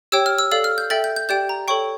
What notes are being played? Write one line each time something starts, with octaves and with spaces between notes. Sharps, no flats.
G4 C#5 G5 E6
F6
E6
A4 D5 F5 E6
F6
G6
A4 E5 G5 A6
G6
G6
G4 D5 G5 G6
A#5
A4 C#5 G5 C#6